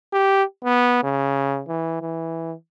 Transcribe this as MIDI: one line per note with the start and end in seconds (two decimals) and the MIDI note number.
0.13 0.44 67
0.64 1.00 59
1.03 1.62 49
1.68 1.97 52
2.01 2.53 52